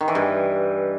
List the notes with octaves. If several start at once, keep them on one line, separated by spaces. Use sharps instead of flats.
D#3
E3
G2